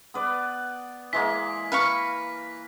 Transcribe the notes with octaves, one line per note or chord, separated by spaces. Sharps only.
B3 B4 D5
E3 G#3 A#3 B6
A#4 B4 F5 C#6